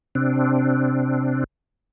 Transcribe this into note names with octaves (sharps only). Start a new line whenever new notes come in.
C3 C4 D4